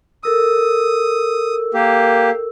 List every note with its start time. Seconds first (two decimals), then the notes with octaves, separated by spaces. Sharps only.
0.23 A4 A#4 D#6 E6
1.74 A#3 G4